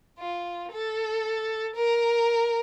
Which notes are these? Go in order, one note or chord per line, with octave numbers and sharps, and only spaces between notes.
F4
A4
A#4